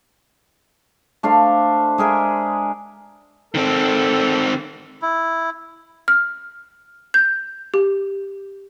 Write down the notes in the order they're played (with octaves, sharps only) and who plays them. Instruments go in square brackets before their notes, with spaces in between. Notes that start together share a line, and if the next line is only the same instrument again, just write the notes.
[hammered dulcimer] A3 D4 C5 F5
G#3 G#4 A#4 E5
[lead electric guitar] D#3 C4 [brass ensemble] A4
[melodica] E4
[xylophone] F6
G6
G4